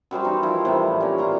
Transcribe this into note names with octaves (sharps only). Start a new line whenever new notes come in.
F#2 G3 C5 A5
E3 D#4 A#5
D#3 F3 E4
A2 C3 E3 G3
C#4 A#4 D5
A#2 F4 A#5